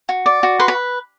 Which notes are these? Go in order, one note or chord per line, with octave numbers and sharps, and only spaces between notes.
F#4
D5
F#4
B4 C6
B5